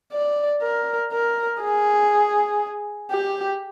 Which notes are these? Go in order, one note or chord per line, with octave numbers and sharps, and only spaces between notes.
D5
A#4
A#4
G#4
G4